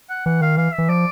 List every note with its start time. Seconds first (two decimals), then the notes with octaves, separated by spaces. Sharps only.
0.10 F#5
0.26 E3 F#5
0.41 D#3 F5
0.57 E3 F5
0.72 E5
0.78 E3
0.89 F3 D5